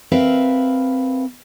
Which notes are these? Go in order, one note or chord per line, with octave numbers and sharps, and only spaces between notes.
C4 A#4 B4 E5 F5